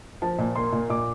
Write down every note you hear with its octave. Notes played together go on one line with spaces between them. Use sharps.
F3 A5
A#2
A#3 C6
A#2
A#2 D6